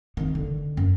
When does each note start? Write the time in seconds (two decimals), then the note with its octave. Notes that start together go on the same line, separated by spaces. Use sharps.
0.17 D#3 C4
0.35 D3
0.77 F#2